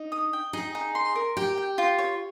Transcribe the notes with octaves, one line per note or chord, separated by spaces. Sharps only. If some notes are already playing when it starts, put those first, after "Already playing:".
Already playing: D#4
D#6
G5
D#4 G#4
D#4
C6
A#4
G4 G5
G5
F4
C#5